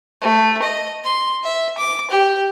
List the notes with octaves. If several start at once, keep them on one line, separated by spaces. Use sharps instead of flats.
A3
D#5
C6
E5
D6
G4